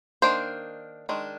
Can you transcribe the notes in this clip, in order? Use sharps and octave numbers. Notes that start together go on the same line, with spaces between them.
D#3 A#3 D4 C5
D#3 G#3 D4